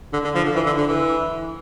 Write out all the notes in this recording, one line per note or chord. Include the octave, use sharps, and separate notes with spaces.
D3
D3
F3
D3
E3
D3
D3
E3